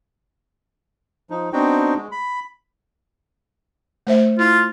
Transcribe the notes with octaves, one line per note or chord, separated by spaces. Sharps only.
F3 D#4
B3 C4 D4 D#4 F#4 G5
G#3
B5
A3 C5 E5
E4 F4